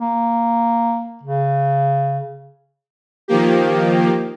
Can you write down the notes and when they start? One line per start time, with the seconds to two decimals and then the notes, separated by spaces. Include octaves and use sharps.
0.01 A#3
1.23 C#3
3.28 D#3 F3 A#3 G4